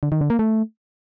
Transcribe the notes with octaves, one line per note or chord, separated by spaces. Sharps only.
D3
D#3
D3
A#3
A3